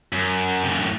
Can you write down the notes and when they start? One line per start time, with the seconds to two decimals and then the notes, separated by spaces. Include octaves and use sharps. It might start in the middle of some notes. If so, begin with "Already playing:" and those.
0.12 F#2
0.63 C3
0.71 A#2
0.79 A2